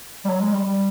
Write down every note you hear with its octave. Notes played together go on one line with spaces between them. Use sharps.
G3
F#3
G#3
G3
G3